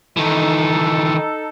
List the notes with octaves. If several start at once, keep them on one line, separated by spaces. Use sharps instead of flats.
D#3 E3 D#4 A4